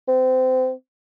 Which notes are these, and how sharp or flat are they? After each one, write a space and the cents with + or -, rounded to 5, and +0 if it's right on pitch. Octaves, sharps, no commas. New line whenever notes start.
C4 -25